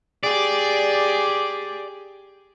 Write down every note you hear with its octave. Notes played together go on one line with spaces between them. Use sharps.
G4 G#4 D5